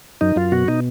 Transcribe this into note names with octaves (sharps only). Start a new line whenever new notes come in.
F#2 D#4
F#2 F4
B2 F#4
B2 D#4